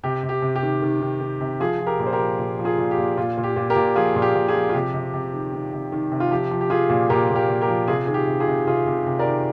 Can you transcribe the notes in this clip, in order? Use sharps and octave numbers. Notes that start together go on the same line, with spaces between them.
C3 G4
C3
G4
C3
G4
D#3
D#3
D#3
D#3
C3
F3 F4 G#4
F3
G4 A#4
A#2
C5
G4 A#4
F3
A#2
F3
F4 G#4
A#2
G4
A#2
A#2 F4
A#2
G4
A#2
G4 A#4
A#2
F3 F4 G#4
A#2
G4
A#2
F4 G#4
F3
F4
C3 G4
C3
C3
D#3
D#3
C3
D#3
C3
F4
F3 G4
F3
G4
F3 F4 G#4
A#2
A#2 G4 A#4
A#2
G4 A#4
A#2
G4 A#4
F3
C3 F4 G#4
D#3 G#4
G4
C3
F4 G#4
C3
C3 F4 G#4
C3
C3
A#4 D5
D#3